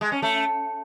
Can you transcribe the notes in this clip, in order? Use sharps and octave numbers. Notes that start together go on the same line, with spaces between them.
G#3
C#4
A3